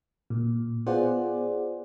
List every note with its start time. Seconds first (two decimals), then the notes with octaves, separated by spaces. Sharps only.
0.30 A#2
0.86 B3 F4 G#4 C5 D5 F#5